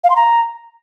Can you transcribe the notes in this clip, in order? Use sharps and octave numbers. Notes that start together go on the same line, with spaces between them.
F5
C6
A#5